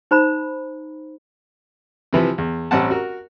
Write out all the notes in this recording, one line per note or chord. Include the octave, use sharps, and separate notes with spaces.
D#4 C5 A#5 B5
C3 E3 F3
E2
A1 G3 C4 C#4 F#5 A5
F#4 A#4